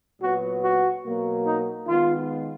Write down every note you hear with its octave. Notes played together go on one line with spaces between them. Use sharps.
A#2 F#3 B3 F#4
F#4
B2 F#3 A#3
D#4
D#3 G#3 B3 F4